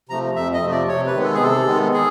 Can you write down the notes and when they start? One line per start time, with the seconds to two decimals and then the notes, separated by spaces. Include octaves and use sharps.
0.09 C3 F3 A3 A#5
0.36 F2 E5
0.54 D#5
0.62 C3 F3 A3
0.71 D5
0.88 C3 C#5
1.07 B4
1.14 D#3 G#3 B3
1.23 A4
1.34 G#4
1.41 C3 A4
1.67 D#3 G#3 B3
1.94 G#4